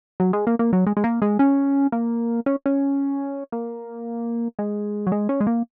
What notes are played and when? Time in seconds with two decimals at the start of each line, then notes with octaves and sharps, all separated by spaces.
0.20 F#3
0.33 G#3
0.47 A#3
0.59 A#3
0.73 F#3
0.87 G#3
0.97 G#3
1.04 A#3
1.22 G#3
1.39 C#4
1.92 A#3
2.46 C#4
2.66 C#4
3.52 A#3
4.59 G#3
5.07 F#3
5.12 G#3
5.29 C#4
5.40 G#3
5.47 A#3